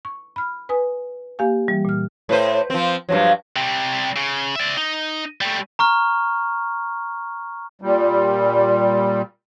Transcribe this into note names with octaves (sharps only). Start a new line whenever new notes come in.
C#6
B5 F6
B4 G#5 D#6
A#3 G4 F5 G#5
E3 G3
A#2 F6
A2 B4 C5
F3 C4
G2 F3 F#3
C3 G3
C#3
D5 E5
D#4
G3 A3
A#5 C#6 F6
A#2 G3